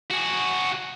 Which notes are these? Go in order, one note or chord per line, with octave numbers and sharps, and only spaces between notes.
F#4 G#4